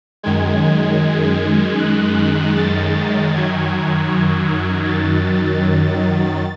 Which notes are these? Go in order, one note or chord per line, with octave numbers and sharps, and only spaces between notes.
F#2 D#3 G#3 G#6
F#6
A6
F#2 D#3 F#3 G#6
A6